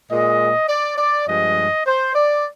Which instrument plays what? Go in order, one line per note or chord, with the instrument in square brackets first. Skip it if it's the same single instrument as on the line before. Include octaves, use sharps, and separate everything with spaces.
[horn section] A#2 G#3 D#5
D5
D5
G2 F3 G#3 D#5
C5
D5